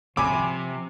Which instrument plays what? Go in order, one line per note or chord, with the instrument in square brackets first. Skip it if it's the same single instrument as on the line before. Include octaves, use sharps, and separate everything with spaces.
[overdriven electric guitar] C3 [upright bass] F3 [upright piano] G#5 B5 D6